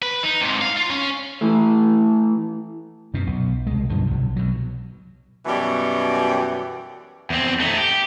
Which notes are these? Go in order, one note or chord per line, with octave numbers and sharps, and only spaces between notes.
B4
D#4
G#2 C3
F5
F4
C#4
E3 A3
F#2 B2
B1
C2 G#3
B1 G2 D3 F3
B1 C3
B2 F#3
F#2 B2 E3 G3
E2 C4
A3 D#4
G4